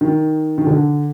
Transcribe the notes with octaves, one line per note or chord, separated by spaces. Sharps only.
D#3
D#3
D3